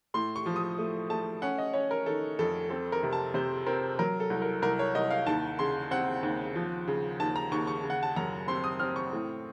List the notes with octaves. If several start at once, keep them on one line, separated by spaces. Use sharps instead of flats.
A2 C6
C#6
F3
D#6
A3
A3 A5
C#4 F#5
D#5
C#4 C#5
A#4
D#3 A4
F2 A4
C4 A4
A#4
C3
A5
C3 C5
C4 A#4
F#3 A#4
A4
C2
A#4
C2 A#4
C#5
C2 D#5
F5
D#2 A5
C#3 C6
C4 F#5
D#2
F3
C#3
D#2 A5
A#5
D#2 C#6
C#6
C#3
F#5
A5
F#2 A#5
C4 C6
D#6
C4 F6
C#6
A2